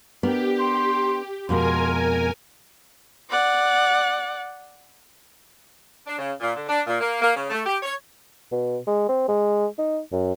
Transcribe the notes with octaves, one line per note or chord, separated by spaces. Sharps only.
B3 D4 G4 A#4
C6
F2 B2 G#3 A#4 G#5 C6
D5 F#5
D4
C#3
A#2
D3
D4
A#2
A#3
A#3
C#3
A3
G4
C#5
B2
G#3
C4
G#3
D#4
F#2